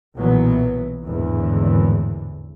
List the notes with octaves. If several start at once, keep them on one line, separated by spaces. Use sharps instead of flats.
B1 A#2 E3 F#3 B3
G#1 E2 A2 D3 E3